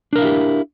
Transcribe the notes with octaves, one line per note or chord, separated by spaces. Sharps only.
D4 E4 G4 A#4 F5